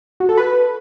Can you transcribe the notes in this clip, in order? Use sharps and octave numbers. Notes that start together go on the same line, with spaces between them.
F#4
A4
B4